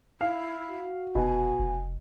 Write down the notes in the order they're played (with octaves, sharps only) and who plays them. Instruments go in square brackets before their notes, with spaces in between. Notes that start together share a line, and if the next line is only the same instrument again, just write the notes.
[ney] E4 [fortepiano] F5
[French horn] F#4
[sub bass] F1 [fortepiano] B2 [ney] G#5
[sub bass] F1